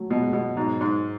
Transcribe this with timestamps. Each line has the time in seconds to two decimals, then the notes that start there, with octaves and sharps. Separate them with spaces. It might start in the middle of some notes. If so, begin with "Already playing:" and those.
Already playing: F#3 A3
0.11 B2 F#3
0.21 G#3
0.33 B2
0.57 G#2 F#3
0.81 G#2